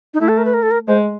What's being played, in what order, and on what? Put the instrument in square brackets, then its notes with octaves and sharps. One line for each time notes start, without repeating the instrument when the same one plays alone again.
[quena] D#4
[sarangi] A3 [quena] E4
[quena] A4
A#4
B4
A#4
A4
A#4
[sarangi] G#3 [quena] C5